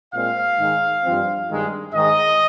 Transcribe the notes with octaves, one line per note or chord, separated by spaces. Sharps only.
A#2 G#3 C4 F5
G#2 D#3 G#3
G2 F3 C4
G2 D#3 G#3
G#2 D#3 G#3 D#5